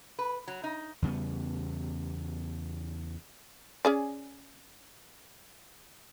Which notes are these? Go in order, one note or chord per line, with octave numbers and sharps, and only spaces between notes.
B4
F#3
D#4
E2 C#3 G3 B3
C#4 G#4 D5